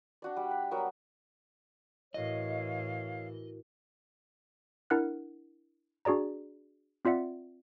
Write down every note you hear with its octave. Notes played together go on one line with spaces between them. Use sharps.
D4 F#4 D5
G3
B5
F#3 B3 A#4
A2 E3 E4 F#4 A#4 C#5 D#5 F5
D4 E4 A#4 F#5 F6 F#6
D4 F#4 G#4 D5 A#5
C4 F4 D5 E5 F#5